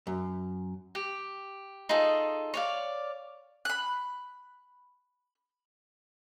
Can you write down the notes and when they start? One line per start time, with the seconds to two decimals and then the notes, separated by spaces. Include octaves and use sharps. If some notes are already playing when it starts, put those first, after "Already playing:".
0.07 F#2
0.95 G4
1.89 D#4 F4 G#4 A4
2.54 C#5 D5 F5
3.65 B5 F#6